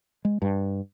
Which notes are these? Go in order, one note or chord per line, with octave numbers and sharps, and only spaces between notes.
G#3
G2